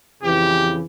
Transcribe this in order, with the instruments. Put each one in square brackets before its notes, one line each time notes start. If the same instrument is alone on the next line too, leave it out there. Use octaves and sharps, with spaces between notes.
[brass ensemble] F2 C#3 E3 [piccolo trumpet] G4